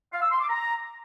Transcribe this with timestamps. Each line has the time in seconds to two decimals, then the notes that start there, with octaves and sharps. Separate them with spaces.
0.13 F5
0.22 E6
0.31 C6
0.40 D6
0.49 A#5